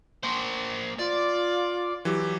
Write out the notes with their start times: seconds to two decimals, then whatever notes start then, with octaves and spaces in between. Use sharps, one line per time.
0.23 A#3 C5
0.99 F4 D5
2.05 E3 F#3 G4